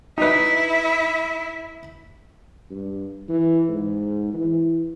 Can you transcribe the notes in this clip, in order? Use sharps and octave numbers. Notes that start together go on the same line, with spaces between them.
D#4 E4 B4 E5
G2
E3
G#2
E3